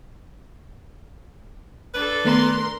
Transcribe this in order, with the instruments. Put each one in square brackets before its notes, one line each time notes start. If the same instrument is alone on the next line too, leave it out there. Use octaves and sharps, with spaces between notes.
[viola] D4 A4 [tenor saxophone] B4
[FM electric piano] D#3 A3 B3 [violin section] A#4 C6